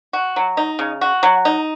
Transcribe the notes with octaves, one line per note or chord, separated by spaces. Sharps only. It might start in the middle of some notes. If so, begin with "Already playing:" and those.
F#4
F#3
D#4
C#3
F#4
F#3
D#4